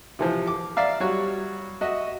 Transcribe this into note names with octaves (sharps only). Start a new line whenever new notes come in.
C3 E3 F3
D6
D5 E5 F5 A#5
F#3 G3 F#4 C#5
F#4 D#5 E5